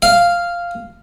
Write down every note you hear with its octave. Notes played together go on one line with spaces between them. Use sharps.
F5